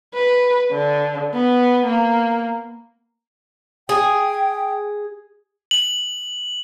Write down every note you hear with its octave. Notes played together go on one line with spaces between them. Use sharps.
B4
D3
B3
A#3
G#4 G5
F#7